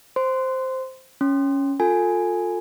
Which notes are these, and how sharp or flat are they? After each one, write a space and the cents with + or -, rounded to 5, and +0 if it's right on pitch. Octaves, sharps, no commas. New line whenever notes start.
C5 +0 C6 -15
C#4 +0 C6 +0
F4 +30 A4 +20 G#5 +0